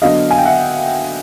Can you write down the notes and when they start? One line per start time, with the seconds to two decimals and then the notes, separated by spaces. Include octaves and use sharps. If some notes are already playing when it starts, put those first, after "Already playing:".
0.02 D3 F#3 B3 D4 D#5 F5
0.31 G#5
0.38 G5
0.45 E5 F#5